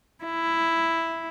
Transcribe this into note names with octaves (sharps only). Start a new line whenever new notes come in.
E4